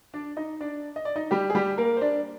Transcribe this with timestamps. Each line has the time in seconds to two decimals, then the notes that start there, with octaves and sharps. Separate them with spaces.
0.14 D4 D5
0.37 D#4 D#5
0.61 D4 D5
0.96 D#5
1.05 D5
1.16 D#4 D#5
1.31 G3 G4
1.50 G#4
1.55 G3 G4
1.78 A#3 A#4
1.97 C5
2.01 D4 D5